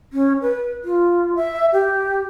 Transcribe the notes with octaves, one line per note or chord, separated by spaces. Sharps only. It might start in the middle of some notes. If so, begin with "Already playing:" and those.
C#4
B4
F4
E5
G4